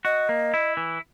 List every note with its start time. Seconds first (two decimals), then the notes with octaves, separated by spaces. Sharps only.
0.05 F#4 D#5
0.29 A#3
0.54 E4
0.77 E3